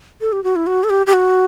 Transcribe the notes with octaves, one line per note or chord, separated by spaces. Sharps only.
A4
G4
F#4
E4
F#4
A4
G4
G4
F#4